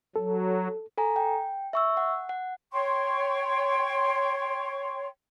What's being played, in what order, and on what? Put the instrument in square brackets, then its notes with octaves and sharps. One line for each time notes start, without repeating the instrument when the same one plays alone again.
[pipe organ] F#3 [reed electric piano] A4
[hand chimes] A4 G#5 A#5
G5
E5 C#6 E6
F#5
F#5
[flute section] C#5 G5 C6 C#6